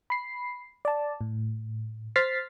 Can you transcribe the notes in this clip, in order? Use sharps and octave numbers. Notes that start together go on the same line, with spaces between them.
B5 C7
D5 A5
A2
C5 F6 A6 B6 C7